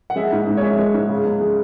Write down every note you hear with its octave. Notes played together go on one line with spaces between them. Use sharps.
F#5
G#3 E5
G#2
G#2
C#5
G#3 E5
G#3
G#2
C#3
C#2
G#3